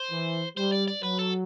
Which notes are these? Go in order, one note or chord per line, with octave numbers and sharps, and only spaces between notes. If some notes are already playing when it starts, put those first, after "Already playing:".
Already playing: C5
E3
G3 C5
D5
D5
F#3 B4
A4